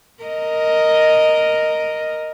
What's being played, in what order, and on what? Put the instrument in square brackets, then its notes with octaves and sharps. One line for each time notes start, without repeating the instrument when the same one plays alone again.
[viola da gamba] A#4 D#5